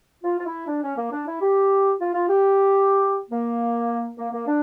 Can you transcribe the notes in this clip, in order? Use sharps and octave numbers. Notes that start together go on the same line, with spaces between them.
F4
F4
E4
D4
C#4
A#3
D4
E4
G4
F4
F4
G4
A#3
A#3
A#3
D4